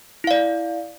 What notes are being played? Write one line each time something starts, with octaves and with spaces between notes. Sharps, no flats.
E4 D5 F5